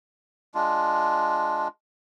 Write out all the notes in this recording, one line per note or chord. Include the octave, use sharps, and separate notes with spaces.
G#3 D4 F4